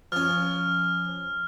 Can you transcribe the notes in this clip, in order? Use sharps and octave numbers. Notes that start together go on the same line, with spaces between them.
F3 C#4 F6